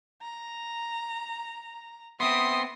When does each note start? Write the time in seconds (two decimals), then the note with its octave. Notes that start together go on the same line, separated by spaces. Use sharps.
0.22 A#5
2.20 B3 C4 E5 C6 D#6